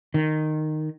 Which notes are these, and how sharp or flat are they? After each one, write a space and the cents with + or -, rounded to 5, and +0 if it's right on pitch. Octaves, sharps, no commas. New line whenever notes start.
D#3 -10